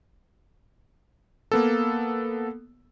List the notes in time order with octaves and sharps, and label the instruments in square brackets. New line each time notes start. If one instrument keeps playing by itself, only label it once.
[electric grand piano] A#3 B3 A4